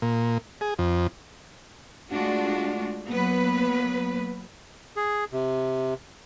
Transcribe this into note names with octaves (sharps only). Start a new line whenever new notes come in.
A#2
G#4
F2
G#3 A3 D4 F4 F#4
F#3 A#3 B3 B4
G#4
C3